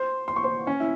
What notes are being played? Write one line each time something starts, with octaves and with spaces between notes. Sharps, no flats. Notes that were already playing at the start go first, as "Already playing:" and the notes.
Already playing: C5 C6
C6
C#6
C5 C6
C#4 C#5
E4 E5